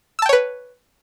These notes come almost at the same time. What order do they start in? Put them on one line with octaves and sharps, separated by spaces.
E6 A5 G5 C#5 B4